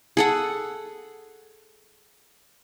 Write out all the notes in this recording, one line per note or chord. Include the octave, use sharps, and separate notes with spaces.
G#4 A4 F#5